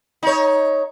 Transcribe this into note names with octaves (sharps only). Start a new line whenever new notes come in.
D#4 C#5